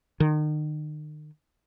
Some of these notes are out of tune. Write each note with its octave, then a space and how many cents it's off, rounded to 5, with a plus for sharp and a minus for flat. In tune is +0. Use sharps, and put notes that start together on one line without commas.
D#3 -40